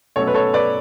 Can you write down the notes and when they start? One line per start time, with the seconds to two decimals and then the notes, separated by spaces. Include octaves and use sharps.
0.16 B2 F#3 A3 C#4 A4 C#5
0.28 B4
0.35 A4 C#5
0.54 B4 D5